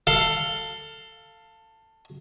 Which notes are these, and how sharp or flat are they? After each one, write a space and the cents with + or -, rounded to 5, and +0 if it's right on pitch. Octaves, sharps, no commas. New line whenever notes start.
A4 +15 F5 +0